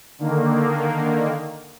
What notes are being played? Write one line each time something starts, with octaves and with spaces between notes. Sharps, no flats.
D3 D#3 A#3